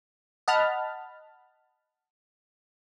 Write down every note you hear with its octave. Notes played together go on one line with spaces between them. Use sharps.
D#5 F#5 A5 B5 F6